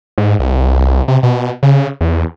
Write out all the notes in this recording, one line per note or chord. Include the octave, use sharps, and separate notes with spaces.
G#2
C2
C3
B2
C#3
E2